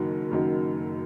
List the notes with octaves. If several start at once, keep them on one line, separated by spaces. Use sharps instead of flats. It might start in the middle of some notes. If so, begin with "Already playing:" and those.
Already playing: F#1 F#2 D#3 F#3
F#1 F#2 D#3 F#3